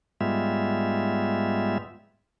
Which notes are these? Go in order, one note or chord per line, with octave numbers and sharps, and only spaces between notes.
G#2 G3 G#3 B3 F4 E5